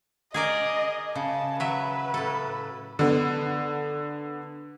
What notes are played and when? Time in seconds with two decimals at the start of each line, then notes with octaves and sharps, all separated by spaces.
0.34 G#4 A#4 D5 D#5
1.15 C#3 A5
1.60 F#3 B4 E5
2.14 A2 A4
2.99 D3 B3